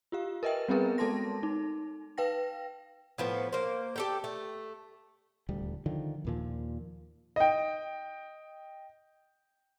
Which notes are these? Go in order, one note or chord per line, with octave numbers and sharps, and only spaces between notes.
F4 G4 F5
A#4 B4 D#5 E5 G5
G3 B3 C4 G#4 A#4 B4
G#3 A4 A5 C6 A#6
D#4
B4 F5 G5 A#6
A2 F3 B3
A#3 C5
G4 A4 G5
A3
D#1 D2 G3
D3 D#3 F3
D#2 A#2 F3
D#5 G5